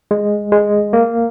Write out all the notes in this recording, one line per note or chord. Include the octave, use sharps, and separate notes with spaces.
G#3
G#3
A#3